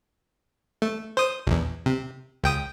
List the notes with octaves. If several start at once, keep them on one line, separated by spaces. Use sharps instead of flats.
A3
C5 D#6
A#1 E2
C3
C#2 G5 D#6